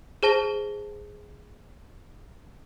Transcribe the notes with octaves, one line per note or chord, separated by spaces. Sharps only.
G#4 C5 A5 A#6 G7